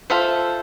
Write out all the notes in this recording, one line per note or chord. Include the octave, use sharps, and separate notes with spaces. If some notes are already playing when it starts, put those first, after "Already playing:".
F4 A4 C5 E5